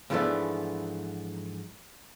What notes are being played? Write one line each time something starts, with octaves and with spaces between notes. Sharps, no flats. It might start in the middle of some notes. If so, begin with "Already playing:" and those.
G#2 E3 F3 A3 B3 D4